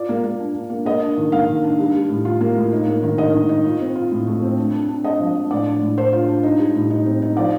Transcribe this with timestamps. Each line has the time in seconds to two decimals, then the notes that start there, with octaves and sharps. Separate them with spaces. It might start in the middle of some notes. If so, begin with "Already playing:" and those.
Already playing: F4 D5
0.09 A#3
0.24 A#3
0.40 D4
0.55 D4
0.70 A#3
0.85 A#3 D#5
1.02 D4
1.17 D#3
1.32 A#3 F5
1.48 D#3
1.64 D4
1.79 G3
1.94 G3
2.09 A2
2.25 F4
2.41 A#3
2.56 A2
2.72 D#4
2.87 A#3
3.03 D#3
3.18 D#3 D#5
3.34 D#3
3.49 D#4
3.64 F4
3.81 C4
3.96 F4
4.11 A2
4.27 A3
4.42 C4
4.57 D4
4.74 D4
4.89 D4
5.04 D4 D#5
5.20 F3
5.35 D4
5.51 A2 D5
5.67 D4
5.81 A2
5.97 D4 C5
6.13 F4
6.29 D4
6.43 D#4
6.59 G3
6.75 A2
6.90 D#4
7.06 C4
7.22 D#4
7.37 F3 D5